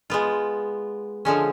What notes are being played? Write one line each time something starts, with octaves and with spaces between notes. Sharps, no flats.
G#3 B3 F4
D3 F3 G#3 C#4